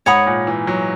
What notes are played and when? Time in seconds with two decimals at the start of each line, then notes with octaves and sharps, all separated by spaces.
0.06 G#2 C#5 F#5 B5 D#6
0.26 A#2
0.47 E3
0.67 F#3